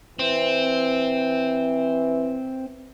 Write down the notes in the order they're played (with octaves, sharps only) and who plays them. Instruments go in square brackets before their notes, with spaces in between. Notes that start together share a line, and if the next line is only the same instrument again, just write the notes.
[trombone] E3 [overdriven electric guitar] C4